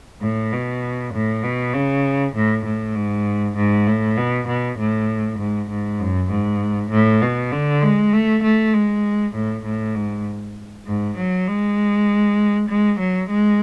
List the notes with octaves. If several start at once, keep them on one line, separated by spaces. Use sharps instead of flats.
A2
B2
A2
B2
C#3
A2
A2
G#2
G#2
A2
B2
B2
A2
G#2
G#2
F#2
G#2
A2
B2
D3
G#3
A3
A3
G#3
A2
A2
G#2
G#2
F#3
G#3
G#3
F#3
G#3